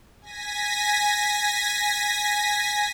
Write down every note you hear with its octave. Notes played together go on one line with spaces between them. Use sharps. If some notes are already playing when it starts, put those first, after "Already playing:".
G#5 A#6 B6